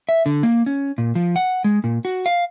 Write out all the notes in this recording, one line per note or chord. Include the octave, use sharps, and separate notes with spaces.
E5
D3
A#3
C#4
A#2
F3
F#5
G#3
A#2
F#4
F5